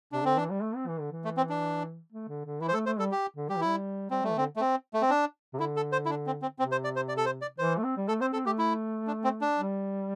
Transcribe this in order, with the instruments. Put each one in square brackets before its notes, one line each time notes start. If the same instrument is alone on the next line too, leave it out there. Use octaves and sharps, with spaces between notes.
[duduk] C3 [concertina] D4
[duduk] D3 [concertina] C4
[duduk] E3 [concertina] D4
[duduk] G3
A3
C4
E3
D3
E3
[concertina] A3
C4
D4
[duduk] A3
D3
D3
[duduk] E3 [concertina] E4
[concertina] C5
[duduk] A3 [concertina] A4
[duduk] A3 [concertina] C5
[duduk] G3 [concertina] A4
[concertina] G4
[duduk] D3
[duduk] G3 [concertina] G4
[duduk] E3
[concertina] E4
[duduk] G3
[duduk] G3 [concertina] C4
[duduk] G3 [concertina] A3
[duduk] E3
[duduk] D3 [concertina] C4
[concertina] A3
C4
A3
C4
D4
[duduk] C3
[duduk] D3 [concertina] E4
[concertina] A4
C5
E4
D4
C4
C4
[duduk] C3 [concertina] C4
[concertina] C5
D5
C5
D5
A4
C5
D5
[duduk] E3 [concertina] C5
[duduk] A3
C4
G3
[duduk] A3 [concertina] A4
[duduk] C4 [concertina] C5
[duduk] C4 [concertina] A4
[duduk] A3 [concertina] G4
[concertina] E4
D4
C4
D4
[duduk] G3